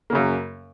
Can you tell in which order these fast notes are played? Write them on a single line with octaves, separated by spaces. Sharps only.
A#3 C#3 F#2